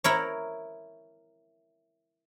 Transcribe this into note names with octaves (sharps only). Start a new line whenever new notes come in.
E4 A#4 C#5